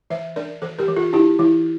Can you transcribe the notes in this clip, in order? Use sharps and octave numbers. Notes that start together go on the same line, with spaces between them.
E3 C5 E5
D4 A#4 D5
E3 A4 C5
G4 A#4
E3
F4 A4
D4 E4 G4
E3 E4